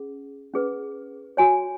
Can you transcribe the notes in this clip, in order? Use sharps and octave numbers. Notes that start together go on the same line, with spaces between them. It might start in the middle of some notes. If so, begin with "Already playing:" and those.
Already playing: C#4 G#4
C#4 G#4 B4
F#4 C#5 G#5